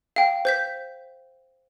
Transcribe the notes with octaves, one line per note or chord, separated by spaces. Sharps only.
F5 G5
C5 G6 B6